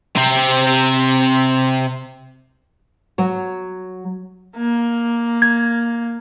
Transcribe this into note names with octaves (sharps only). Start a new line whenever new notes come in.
C3 C4
F#3 C#5
A#3
G#6